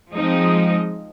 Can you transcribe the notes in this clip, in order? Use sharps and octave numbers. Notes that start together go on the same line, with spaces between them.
F3 G#3 C4 D#4 D#5